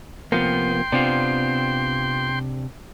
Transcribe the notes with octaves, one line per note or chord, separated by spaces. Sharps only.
C3 F3 A#3 B3 G5 C6
C3 B3 C4 D4 F4